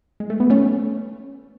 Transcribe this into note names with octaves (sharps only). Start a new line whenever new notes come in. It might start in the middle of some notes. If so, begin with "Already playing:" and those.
G#3
A3
B3
A3 C#4